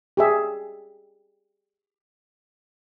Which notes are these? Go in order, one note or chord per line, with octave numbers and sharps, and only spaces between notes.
G4 G#4 E5